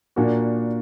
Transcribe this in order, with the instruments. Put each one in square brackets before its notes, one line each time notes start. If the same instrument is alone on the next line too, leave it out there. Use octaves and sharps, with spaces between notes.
[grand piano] A#2 A#3 D4 F#4